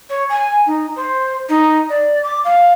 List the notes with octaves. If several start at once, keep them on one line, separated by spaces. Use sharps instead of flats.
C#5
G#5
D#4
C5
D#4
D5
D6
F5